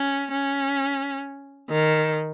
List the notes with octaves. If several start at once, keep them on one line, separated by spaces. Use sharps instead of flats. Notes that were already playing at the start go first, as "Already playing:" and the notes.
Already playing: C#4
C#4
D#3